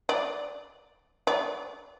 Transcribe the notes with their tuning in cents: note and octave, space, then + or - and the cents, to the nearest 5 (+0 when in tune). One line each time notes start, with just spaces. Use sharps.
D5 -15
D5 -30